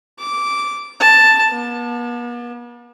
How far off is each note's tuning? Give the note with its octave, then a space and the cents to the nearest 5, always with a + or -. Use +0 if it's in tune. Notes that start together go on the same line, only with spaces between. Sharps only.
D6 -10
A5 +5
B3 -45